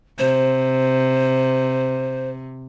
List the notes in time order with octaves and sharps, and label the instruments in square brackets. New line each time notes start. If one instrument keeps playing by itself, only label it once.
[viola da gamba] C3 [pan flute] C5